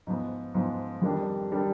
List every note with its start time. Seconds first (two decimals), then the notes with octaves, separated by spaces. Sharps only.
0.07 G#2 F3 B3
0.54 G#2 F3 B3
1.01 F2 D#3 G3 D4
1.51 D#3 G3 D4